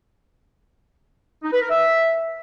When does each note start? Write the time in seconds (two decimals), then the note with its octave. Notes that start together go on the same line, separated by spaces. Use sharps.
1.43 D#4
1.52 B4
1.61 A#4
1.70 E5